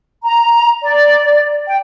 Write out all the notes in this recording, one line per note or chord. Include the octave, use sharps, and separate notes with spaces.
A#5
D5
G5